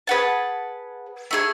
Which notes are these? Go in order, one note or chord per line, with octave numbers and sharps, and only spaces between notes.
G#4 B4 F#5 A5
A3 E4 G#4